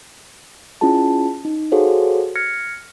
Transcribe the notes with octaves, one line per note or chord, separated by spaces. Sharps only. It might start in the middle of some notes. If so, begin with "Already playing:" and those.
C#4 E4 F4 G#4 A5
D#4
F#4 G#4 A4 C5 C#5 F5
F6 G#6 A#6 C#7